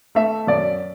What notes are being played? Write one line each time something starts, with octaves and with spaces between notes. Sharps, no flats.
A3 E5
F#2 D5